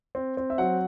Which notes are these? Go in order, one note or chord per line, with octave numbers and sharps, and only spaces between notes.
C4
C4
E5
F#3 F#5